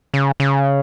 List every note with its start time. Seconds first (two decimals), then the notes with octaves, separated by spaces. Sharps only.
0.14 C#3
0.40 C#3